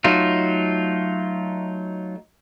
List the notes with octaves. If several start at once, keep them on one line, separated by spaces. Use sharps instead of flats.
F#3 A3 D#4 F4